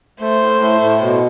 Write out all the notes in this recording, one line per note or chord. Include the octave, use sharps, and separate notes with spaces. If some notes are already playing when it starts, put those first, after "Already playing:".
A3 C5
A2
A3
A2
B2